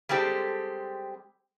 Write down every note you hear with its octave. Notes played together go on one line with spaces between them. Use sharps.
G3 G#3 C4 G4 A4